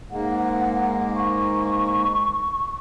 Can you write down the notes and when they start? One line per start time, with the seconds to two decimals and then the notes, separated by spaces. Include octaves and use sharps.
0.11 G#2 G#3 A#3 F#5
1.16 C#6